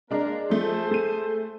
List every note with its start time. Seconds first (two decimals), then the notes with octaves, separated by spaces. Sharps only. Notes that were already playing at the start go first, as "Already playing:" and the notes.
0.11 G#3 A#3 D4 A#4
0.50 F3 A3 G#4 A4 C5
0.91 A3 D#7